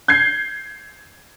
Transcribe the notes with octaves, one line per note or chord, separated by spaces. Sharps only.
G6 G#6 C7